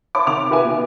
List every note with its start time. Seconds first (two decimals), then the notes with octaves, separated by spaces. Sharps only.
0.15 C#5 E5 A5 B5 D6
0.27 C3 D#3 D6 F7
0.50 F4 G4 A#4 B4 E5 G#5
0.65 B2